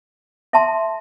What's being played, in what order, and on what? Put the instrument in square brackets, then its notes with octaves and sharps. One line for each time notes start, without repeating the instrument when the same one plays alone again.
[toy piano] A4 E5 A5 C6